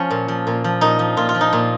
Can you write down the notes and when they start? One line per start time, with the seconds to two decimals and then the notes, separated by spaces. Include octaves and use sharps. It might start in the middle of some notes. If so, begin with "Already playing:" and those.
Already playing: F3 C#4
0.11 A#2
0.28 F3
0.47 A#2
0.64 F3
0.81 A#2 D#4
0.99 F3
1.17 A#2 F4
1.29 F4
1.35 F3
1.41 D#4
1.53 A#2